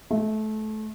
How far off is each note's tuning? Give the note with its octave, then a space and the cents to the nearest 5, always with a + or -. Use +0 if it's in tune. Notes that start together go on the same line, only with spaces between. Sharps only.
A3 -25